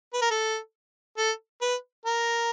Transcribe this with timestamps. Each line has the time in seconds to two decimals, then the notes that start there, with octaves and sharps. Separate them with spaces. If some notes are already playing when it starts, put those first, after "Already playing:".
0.14 B4
0.22 A#4
0.31 A4
1.18 A4
1.61 B4
2.06 A#4